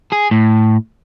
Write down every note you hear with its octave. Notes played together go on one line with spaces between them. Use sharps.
G#4
A2